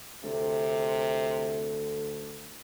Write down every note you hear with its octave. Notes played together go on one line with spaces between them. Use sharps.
D2 C3 A4